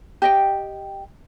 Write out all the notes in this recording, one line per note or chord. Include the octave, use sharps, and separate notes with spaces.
G4 D#5 G5